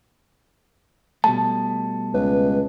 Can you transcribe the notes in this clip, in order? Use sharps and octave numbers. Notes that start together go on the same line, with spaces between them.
B2 G3 A3 A5
C#2 B4